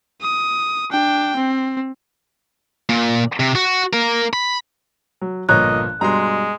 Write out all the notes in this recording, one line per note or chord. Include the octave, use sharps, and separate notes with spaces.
D#6
D4 G5
C4
A#2
C3
F#4
A#3 A#4
B5
F#3
G1 A#2 F3 C#5 D#5 A#5 F#6
G2 B2 G#3 A#5 C6